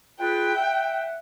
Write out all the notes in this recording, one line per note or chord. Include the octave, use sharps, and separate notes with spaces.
F4 G#4 B4 G5
E5 F#5